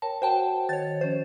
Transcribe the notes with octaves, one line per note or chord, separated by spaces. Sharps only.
A#4 C#5 G5 A5
F#4 C5 F#5 G5 A5
D#3 C#5 A6
F3 C#4 C5